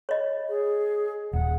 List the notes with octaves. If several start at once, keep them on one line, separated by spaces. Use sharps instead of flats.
C#5 D#5
G#4
D#1 F#5